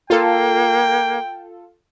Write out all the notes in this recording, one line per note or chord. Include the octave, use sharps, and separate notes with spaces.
A#3 F4 A4 G5